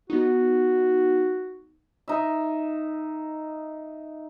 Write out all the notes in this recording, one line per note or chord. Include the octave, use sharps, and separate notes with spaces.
B3 D#4 F#4
D#4 E5